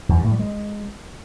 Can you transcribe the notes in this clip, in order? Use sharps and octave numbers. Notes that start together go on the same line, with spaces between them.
E2
G2
A2
G3
G#3